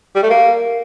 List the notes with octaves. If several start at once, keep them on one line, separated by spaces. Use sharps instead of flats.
G3
A3
A#3